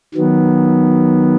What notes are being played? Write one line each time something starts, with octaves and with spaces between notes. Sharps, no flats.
D#3 F#3 B3